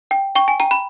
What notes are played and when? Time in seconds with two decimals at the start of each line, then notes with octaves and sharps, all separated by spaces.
0.11 G5
0.36 G5 C#6
0.48 G#5
0.60 G5 A#5
0.71 B5